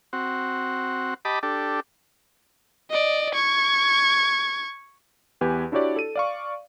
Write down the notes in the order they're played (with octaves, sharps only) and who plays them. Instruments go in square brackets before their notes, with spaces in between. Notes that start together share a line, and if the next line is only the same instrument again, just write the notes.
[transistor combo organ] C4 F#4
G4 D#5 A5 B5 D6
D4 G4 A4
[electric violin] D5 D#5
C#6 G#6
[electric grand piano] E2 G4 B4 G#5
D4 E4 F#4 G4 C#5 D5
A4 D#7
D5 F5 C#6